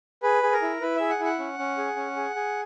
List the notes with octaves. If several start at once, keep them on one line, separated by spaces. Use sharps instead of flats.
G#4 B4
G#4
A#4
E4
E4 B4
G#4 E5
F#5
E4 F#5
C#4
C#4
G#4
C#4
G#4
G#4